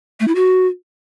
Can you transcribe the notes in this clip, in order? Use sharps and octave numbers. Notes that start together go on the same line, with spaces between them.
A3
E4
F#4